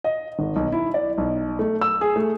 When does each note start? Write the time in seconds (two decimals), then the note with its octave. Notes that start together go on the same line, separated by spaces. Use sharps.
0.04 D#5
0.39 G#1
0.56 B1
0.72 E4
0.94 D5
1.18 B1
1.59 A3
1.81 E6
2.01 G#4
2.16 A3